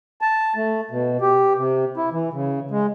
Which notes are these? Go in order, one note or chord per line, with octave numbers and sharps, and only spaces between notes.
A5
A3
B2
G4
C3
E4
E3
C#3
G#3